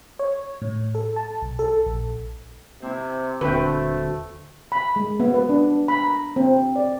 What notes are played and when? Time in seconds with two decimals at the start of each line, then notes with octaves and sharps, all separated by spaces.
0.19 C#5
0.62 A2
0.95 A4
1.16 A5
1.42 B1
1.59 A4
1.86 A#1
2.82 C3 C4 E4
3.41 D#1 D3 A3 C4 F#4 B4 G5
4.72 B5
4.96 G#3
5.20 B3
5.34 B4
5.49 D4
5.88 B5
6.04 A#5
6.36 C4
6.76 D5